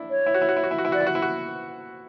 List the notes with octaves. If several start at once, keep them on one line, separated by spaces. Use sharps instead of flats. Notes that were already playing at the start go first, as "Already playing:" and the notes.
Already playing: D4 E4
C#5
E4
F#4
E4
F#4
E4
F#4
E4
F#4
E4
F#4 D5
E4
F#4
E4
F#4